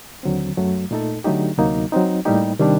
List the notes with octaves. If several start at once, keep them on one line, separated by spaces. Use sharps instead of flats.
D#2 D3 F#3 C4
F#2 F#3 A3
A#2 A3 D#4 A4
D3 F#3 A3 D#4 G4
D2 C3 F#3 A#3 D#4
F#3 C4 D#4
A2 G3 A#3 D#4 G4
C3 D#3 G3 D4